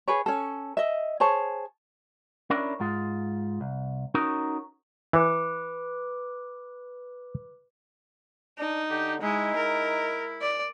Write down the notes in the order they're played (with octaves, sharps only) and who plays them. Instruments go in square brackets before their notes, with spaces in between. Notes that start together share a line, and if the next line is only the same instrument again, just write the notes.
[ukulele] G#4 B4 C#5
C#4 A4
D#5 E5
G#4 C5 C#5 A5
[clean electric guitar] C#4 D4 E4 A#4 D5
G#2 G#3 F4
C2
C#4 D#4 F#4 A#4
[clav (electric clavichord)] E3 [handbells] B4 D6
[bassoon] D4 [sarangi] D#4
[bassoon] D3 [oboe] G4
[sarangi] G#3 [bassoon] D#4 [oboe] E4
[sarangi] A#4
D5